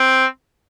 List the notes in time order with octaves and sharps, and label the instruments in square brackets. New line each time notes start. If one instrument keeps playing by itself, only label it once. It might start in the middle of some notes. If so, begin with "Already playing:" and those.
Already playing: [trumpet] C4